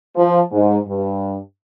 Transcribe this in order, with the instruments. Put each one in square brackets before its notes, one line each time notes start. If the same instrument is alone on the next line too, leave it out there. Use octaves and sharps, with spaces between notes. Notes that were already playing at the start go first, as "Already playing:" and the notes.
[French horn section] F3
G#2
G2